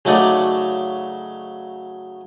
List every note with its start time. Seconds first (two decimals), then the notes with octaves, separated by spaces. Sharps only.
0.05 C#3 F#3 A3 D#4 F#4 D5